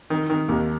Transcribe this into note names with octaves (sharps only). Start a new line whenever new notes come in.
D#3
D#3
D#2